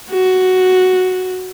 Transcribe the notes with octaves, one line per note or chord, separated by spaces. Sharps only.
F#4